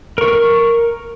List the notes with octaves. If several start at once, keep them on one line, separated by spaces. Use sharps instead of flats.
A#4 C#6